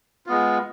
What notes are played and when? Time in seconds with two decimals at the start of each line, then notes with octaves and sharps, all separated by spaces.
0.26 G#3 B3 F4